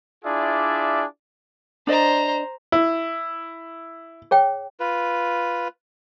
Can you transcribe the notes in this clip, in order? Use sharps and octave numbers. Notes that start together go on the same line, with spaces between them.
D4 E4 F4 G#4 D5 E5
D4 C5 D5 D#5 A#5
E4
G#4 C#5 G5
F4 B4